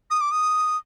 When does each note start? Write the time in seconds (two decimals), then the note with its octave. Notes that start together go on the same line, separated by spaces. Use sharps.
0.10 D#6
0.21 D6
0.31 D#6